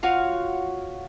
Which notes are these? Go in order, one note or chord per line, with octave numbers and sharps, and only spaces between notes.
F4 F#4 C#5 F5